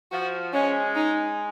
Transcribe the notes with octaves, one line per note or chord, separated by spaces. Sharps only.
F3 F#4
G#3 C#4
D#4